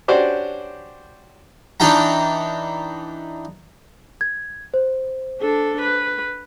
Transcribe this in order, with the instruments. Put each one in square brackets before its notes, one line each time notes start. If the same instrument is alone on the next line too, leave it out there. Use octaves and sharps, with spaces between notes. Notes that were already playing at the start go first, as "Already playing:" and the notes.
[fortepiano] C#4 D4 F#4 G4 C5 D5
[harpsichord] E3 D4 D#4 G5 A#5
[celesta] G#6
C5
[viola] D4 A4
B4